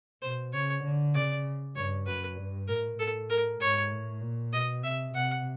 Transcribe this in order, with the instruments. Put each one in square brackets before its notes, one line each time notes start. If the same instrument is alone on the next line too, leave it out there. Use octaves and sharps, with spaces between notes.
[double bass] B2 [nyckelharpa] C5
[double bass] C#3 [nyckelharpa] C#5
[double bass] D3
[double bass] C#3 [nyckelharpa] D5
[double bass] G2 [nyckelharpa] C#5
[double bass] F#2 [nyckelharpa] B4
[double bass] G2
[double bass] A2 [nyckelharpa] A#4
[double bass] A2 [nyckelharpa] A4
[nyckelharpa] A#4
[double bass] G#2 [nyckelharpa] C#5
[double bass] A2
A#2
[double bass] B2 [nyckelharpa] D#5
[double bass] C3 [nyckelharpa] E5
[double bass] C3 [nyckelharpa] F#5